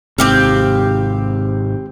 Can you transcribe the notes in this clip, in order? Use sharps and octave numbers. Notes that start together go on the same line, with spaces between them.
G#1 G#2 C3 C4 G4 F5